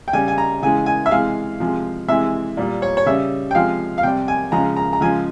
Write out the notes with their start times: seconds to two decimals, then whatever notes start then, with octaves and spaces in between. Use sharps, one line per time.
0.08 G5
0.13 C#3 G3 G#5
0.28 G#5
0.38 A#5
0.62 C#3 E3 G#3 G#5
0.86 G#5
1.06 E5
1.11 C3 E3 G#3 F5
1.60 C3 F3 G#3
2.08 C3 E3 G#3 E5
2.57 A#2 G3
2.82 C#5
2.97 C#5
3.06 C#3 G3 E5
3.51 G5
3.55 C3 F3 G#3 F5
3.98 F5
4.03 C3 G3 G5
4.28 G#5
4.52 C#3 F3 G#3 A#5
4.77 A#5
4.93 A#5
5.01 C#3 F3 G#3 G#5